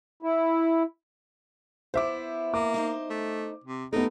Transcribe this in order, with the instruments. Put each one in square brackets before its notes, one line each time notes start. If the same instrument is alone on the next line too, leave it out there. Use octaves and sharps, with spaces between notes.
[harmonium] E4
[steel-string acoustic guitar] B3 E4 [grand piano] C5 E5 D6
[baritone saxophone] A#3 [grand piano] D6
[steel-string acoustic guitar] D#4 C5 D#5
[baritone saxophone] A3
C3
[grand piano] A3 B3 [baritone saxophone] D#4 [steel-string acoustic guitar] G4 A#4